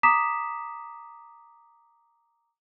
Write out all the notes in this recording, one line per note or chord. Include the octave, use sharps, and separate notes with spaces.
A#5 D6 D#6 B6 E7